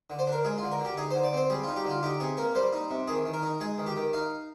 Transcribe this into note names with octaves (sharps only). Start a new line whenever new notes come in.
D3
C5
D4 A#4
G#3 G#4
F4
D3
A#4
D3 G4
D#4 G#4
D3 C5
D5
C4 C5
G3 G#4
D#4 F4
G4
D3 F4
D#4 G4
C3 G#4
A#3 A#4
G3 C5
D#4
C3
D#3 G#4
D#3
A#4
D#4
G#3 G#4
D#3
G4
D#3
D#4 F5